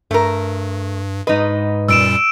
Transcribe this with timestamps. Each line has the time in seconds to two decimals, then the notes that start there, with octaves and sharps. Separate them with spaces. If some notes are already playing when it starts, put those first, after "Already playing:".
0.11 G2 A3 A#4
1.27 G#2 E3 D#4 B4 D#5
1.88 F#2 A#2 G3 E6 D7 E7